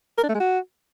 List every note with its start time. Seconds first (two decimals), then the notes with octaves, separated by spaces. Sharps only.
0.18 A#4
0.23 D4
0.29 A3
0.34 G#3
0.40 F#4